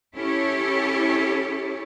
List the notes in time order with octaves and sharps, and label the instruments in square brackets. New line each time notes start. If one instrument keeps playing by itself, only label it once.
[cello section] C#4 E4 G4 A4 C#5